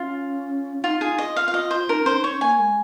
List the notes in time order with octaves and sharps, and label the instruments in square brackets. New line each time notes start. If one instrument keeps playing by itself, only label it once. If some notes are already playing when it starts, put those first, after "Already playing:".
Already playing: [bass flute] C#4 [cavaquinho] F4
[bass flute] D#4 [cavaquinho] F4
[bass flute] D#4 [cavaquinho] G#4
[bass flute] F4
[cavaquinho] D#5
F5
F5
D#5
C5
[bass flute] D#4 [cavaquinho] A#4
[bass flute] C#4 [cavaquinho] C5
[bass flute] D#4
[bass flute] C#4 [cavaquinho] C#5
[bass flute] A#3 [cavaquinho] G#5
[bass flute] G#3